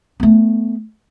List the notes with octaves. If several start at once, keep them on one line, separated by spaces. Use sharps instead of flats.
A3 B3